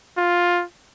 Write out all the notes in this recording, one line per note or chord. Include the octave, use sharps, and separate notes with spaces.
F4